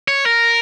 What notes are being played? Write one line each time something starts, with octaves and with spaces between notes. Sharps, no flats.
C#5
A#4